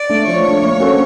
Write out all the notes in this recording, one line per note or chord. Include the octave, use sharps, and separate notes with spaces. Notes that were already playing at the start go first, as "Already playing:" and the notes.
Already playing: D5
A3 D4
F3 C#5
A3 D4
A#3
C#4 F#4 A4 C5